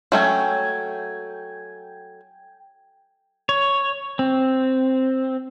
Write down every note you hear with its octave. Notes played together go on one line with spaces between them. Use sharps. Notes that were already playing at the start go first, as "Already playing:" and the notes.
F#3 A3 C#4 G5 G#5
C#5
C4